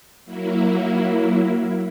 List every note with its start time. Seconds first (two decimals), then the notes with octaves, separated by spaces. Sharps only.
0.25 F#3 A#3 E4